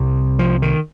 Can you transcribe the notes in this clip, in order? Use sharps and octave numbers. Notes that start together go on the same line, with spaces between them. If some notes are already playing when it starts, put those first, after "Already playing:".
Already playing: C2 C3
F3
D#3